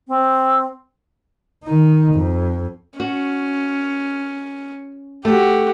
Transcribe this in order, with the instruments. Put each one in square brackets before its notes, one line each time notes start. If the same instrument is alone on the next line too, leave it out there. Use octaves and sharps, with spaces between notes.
[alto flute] C4
[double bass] D#3 D#4
F2
[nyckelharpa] C#4 [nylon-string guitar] F#4
[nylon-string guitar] A3 [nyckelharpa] F#4 G4